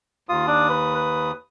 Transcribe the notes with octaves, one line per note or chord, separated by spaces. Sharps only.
D#2 F4 D#6
D4
B4
B4